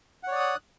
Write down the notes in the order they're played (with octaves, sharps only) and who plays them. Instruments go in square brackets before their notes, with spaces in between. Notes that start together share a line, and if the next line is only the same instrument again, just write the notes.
[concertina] F#5
C#5
D5
D#6
F#6